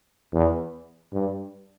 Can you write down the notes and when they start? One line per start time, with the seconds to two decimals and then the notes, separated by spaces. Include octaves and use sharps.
0.33 E2
1.13 G2